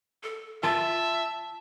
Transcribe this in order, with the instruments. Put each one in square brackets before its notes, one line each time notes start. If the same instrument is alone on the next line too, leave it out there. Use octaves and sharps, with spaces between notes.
[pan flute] A4
[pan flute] F4 [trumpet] E5 [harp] A5